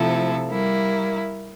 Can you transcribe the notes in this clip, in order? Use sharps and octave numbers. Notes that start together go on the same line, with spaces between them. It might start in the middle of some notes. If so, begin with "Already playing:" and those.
Already playing: C3 F3 A3 E4 A4
G3 A#3 E4